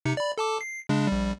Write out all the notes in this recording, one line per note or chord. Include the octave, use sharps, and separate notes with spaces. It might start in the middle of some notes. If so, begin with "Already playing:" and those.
C3 D#4 C#7
D5 B5
A4 A5 D6
C7
C#3 G#3 D4
A#1 G3